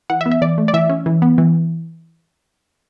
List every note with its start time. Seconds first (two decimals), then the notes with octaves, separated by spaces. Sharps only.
0.10 E3 F#5
0.21 E5
0.26 B3
0.32 E5
0.42 E3 D5
0.58 A3
0.68 D5
0.74 E3 E5
0.90 C#4
1.06 E3
1.22 B3
1.38 E3